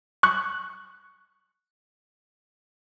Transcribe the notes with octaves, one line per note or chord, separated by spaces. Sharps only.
C#6 F#6